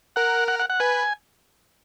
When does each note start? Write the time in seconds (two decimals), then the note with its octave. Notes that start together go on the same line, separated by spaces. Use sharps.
0.16 A#4 F#5
0.48 F#5
0.59 F#5
0.70 F#5
0.80 B4 G#5